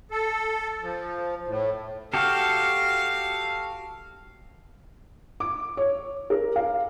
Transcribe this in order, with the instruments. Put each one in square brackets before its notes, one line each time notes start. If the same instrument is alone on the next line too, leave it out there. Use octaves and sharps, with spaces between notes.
[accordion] A4
F3
A2
[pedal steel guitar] F#4 G4 A4 [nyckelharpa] F5
[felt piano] D6
C#5
A#4
F5